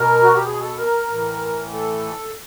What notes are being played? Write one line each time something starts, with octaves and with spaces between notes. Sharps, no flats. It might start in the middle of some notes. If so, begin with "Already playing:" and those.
Already playing: B2 A#4
F#4
G4
G#4
A4
A#4
A2 E3
A4